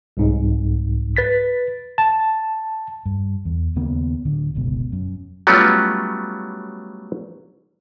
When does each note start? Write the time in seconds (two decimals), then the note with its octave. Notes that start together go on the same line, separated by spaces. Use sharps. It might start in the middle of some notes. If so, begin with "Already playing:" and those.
0.17 C2 G#2
1.16 B4 A6 B6
1.98 A5
3.06 G2
3.45 E2
3.76 D#2 C#3 A#3 B3
4.25 D1 D3
4.55 F#1 C#2 B2
4.92 F#2
5.47 F#3 G3 A3 B3 C#4 F4